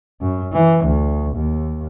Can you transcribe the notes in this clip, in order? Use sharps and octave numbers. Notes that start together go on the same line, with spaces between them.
F#2
E3
D2
D#2